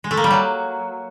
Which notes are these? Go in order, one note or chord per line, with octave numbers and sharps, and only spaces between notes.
G#3
A3
A#3
G3
F#3